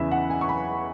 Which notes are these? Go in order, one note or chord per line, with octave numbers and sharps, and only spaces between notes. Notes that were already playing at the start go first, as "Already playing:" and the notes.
Already playing: E2 C#3 E3 E5 B5
F#5
G#5
C#6
B5